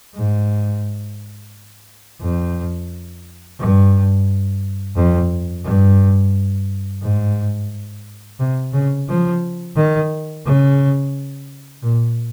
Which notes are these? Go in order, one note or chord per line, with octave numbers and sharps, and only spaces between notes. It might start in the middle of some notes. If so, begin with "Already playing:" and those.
G#2
F2
G2
F2
G2
G#2
C3
C#3
F3
D#3
C#3
A#2